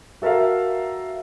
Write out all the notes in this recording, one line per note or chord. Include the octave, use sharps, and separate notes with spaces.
F#4 A4 A#4 E5 F5